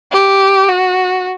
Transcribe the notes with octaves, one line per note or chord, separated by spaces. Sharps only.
G4
F#4